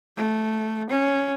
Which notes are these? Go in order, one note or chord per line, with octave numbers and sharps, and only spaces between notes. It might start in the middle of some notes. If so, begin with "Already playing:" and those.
A3
C#4